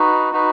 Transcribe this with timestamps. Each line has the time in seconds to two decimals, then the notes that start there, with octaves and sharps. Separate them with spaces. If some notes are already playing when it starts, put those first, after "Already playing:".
Already playing: D#4 F#4 B4
0.33 D#4 F#4 B4